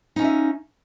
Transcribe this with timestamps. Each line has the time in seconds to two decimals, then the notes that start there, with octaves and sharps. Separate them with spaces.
0.16 D#4
0.19 C#4
0.22 F4
0.24 E5